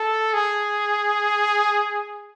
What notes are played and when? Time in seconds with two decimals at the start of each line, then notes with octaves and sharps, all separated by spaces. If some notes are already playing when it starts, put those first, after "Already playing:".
Already playing: A4
0.33 G#4